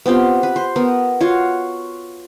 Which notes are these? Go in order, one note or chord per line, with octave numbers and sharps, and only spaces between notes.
B3 C4 F4 G4
B4
C5
B3 A#4
F4 F#4 C#5